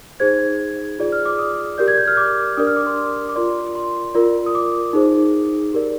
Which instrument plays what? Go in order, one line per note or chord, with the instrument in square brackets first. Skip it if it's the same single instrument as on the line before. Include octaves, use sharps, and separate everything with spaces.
[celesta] D#4 G#4 C5 G#6
F4 G#4 D5
F6
D6
D#6
G4 A#4 D5 G6
G#6
G6
F6
D6
D4 G4 A#4 D5 D#6
F6
D6
C6
D6
F4 A#4 D5 C6
C6
F4 A#4 D5
D#6
D6
D#4 G#4 C5
G4 A#4 D5